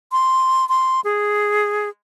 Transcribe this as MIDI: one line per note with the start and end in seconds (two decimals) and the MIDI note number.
0.12 0.67 84
0.69 1.01 84
1.04 1.89 68